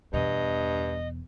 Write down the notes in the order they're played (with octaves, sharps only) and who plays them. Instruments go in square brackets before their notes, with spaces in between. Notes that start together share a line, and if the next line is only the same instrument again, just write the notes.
[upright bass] E2 B2 [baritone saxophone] G2 [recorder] D#5